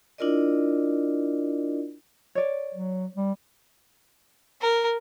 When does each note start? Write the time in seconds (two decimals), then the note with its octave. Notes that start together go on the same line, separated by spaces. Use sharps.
0.18 D4 E4 F4 A#4 D5 D#5
2.35 C#5 D5
2.75 F#3
3.16 G3
4.62 A#4